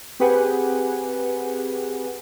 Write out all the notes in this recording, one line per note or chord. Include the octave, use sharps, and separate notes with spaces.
C4 G4 G#4 B4 F#5 G#5